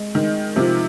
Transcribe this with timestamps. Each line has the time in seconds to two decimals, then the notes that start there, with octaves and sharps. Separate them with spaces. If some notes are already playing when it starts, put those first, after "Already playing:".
Already playing: G#3
0.15 D#3 G#3
0.56 C3 F3